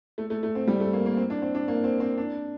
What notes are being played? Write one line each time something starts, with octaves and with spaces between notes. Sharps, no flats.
A3
A3
A3
C4
G3
A3
A#3
A#3
C4
D4
C4
D4
A#3
C4
C4
D4